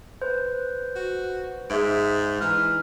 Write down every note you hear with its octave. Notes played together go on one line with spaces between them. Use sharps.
B4 C5
F#4
G#2 G#4 E5 D7
E3 D#4 F6